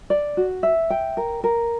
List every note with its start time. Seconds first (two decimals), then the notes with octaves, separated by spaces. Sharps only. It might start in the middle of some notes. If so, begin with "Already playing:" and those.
0.10 D5
0.37 F#4
0.63 E5
0.90 G5
1.17 A#4
1.44 A#4